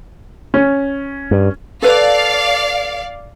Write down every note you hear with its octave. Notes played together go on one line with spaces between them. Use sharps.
C#4
G2
A4 B4 D5 F5